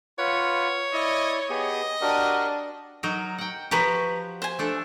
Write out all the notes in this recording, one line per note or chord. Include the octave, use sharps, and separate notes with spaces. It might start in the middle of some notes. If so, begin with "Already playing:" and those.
F4 B4 C#5 F#5
E4 D5 D#5
B3 G4 G#4 D#5
D4 F#4 G4 A#4
F#3 D#4 A#4
F#5 G5
F3 F#4 G4 B4 A#5 C#6
C5 G#5
A3 D4 A4